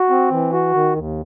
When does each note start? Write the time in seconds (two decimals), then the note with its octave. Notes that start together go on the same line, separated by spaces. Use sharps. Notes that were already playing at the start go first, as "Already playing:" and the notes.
Already playing: F#4
0.10 C4
0.31 E3
0.53 F#4
0.74 D#3
0.96 D#2